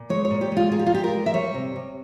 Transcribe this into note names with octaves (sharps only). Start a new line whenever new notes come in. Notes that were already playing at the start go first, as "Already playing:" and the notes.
Already playing: A#2
G#3 C#5
C#5
A#2
G4
G#3 F4
A#2 G#4
G4
F4
G#3 G4
A#4
A#2
E5
G3 C#5
C3
C3